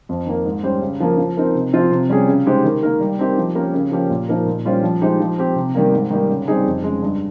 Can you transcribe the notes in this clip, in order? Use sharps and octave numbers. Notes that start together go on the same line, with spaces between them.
F2
D#3 A#3
G#2
G3 C#4 G4 C5
C#3
F3 A#3
F3
C4 D#4 A#4
C3
F3 C4 F4
C3
G3 C#4 G#4
C#3
G#3 D#4 G4 C5
D#3
A#3 D#4 A#4
G3
C4 D#4 G4 A#4
F3
A#3 C#4 G4 A#4
C#3
F3 A#3 C#4 G4
A#2
F3 A#3 D#4 A#4
A#2
G3 C#4 F4 C5
F3
G#3 D#4 G4 C5
F3
C4 G4
C3
D#3 G3 A#3
G#2
D#3 G3 A#3
C#3
G3 C4 D#4 G#4
F2
C#3 G#3
G2